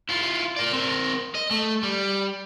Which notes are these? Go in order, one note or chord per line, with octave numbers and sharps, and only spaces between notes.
E4 F4
A#4 D5
C4 A#4
D#5
A3
G3